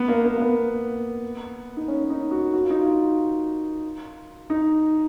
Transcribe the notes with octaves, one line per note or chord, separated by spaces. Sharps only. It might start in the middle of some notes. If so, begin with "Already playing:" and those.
Already playing: B3
A#3
A#3
A#3
B3
D#4
C#4
D#4
F#4
F#4
F4
D#4
F4
D#4